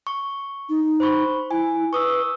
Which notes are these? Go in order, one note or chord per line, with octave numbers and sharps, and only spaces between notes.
C#6
D#4
C5 B5 C#6
E4 G#5
B4 C#6 D#6 E6